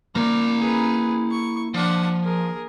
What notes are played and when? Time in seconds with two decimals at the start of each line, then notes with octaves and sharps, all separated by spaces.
0.15 A#3 E4 D5 A#5
0.58 G#4 B4
1.31 C#6
1.74 F3 D4 F#5
2.23 G#4 A#4